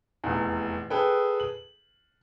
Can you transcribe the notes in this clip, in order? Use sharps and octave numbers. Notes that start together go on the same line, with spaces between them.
F1 E2
G#4 A4 B4 G5
F#7